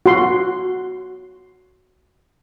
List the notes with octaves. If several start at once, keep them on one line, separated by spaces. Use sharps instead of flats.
F#4 C6